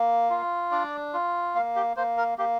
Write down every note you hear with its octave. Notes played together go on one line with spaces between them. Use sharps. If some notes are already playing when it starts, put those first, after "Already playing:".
Already playing: A#3
F4
D4 D5
F4
A#3 F5
G4
A#3 C5
A#4
A#3 G4